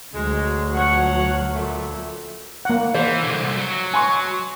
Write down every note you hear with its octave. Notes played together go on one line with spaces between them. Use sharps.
D2 F#3 G#3
F3 C#5 F#5
A#2 A3
A#3 F#5
E3 C5
C2 D3
F#3
G#5 C6 C#6